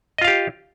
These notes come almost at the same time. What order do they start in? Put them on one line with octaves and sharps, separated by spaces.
D#5 F4 F5 G4